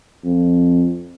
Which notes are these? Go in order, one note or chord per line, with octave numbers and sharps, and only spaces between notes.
F2